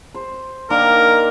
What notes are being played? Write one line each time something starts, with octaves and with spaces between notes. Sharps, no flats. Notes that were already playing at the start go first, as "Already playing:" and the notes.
C5
D#3 A#3 D4 A#4